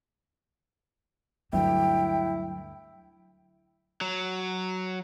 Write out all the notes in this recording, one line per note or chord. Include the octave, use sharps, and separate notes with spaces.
D2 G2 F#3 E4 G5
F#3